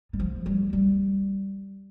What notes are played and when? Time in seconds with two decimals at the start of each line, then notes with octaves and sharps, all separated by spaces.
0.13 G3
0.20 F3
0.46 G3
0.73 G3